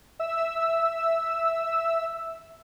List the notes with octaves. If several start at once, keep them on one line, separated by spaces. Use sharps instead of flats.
E5 E6